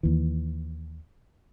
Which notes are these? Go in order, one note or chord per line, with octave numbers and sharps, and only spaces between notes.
D#2 E3